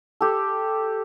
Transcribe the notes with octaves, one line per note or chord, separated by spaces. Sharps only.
G4 A4